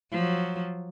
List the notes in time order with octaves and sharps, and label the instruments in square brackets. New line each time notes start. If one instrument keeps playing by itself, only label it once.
[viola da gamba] F3 F#3